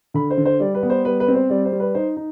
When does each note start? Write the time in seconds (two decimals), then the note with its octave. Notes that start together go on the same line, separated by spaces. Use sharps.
0.14 D3 B5
0.30 C5
0.38 D3
0.45 C5
0.60 G3 D5
0.75 B4
0.83 B3
0.90 C5
1.05 G3 B4
1.20 B4
1.28 C4
1.35 C5
1.50 G3 D5
1.65 C5
1.72 G3
1.80 B4
1.95 D#4 C5
2.17 D#4